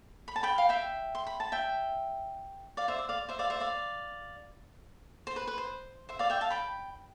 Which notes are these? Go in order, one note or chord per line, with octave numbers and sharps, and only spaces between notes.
B5
A5
G5 B5
F5
E5 G5
C6
B5
A5
E5 G5
D5 F5
C5 E5
D5
D5 F5
C5 E5
D5 F5
C5 E5
D5 F5
C5
B4
B4
C5
C5 E5
D5 F5
E5 G5
F5 A5
G5 B5